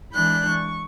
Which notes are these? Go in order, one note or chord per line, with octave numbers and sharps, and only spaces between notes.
E3 G#3 D4 B5 F#6 G6
C#6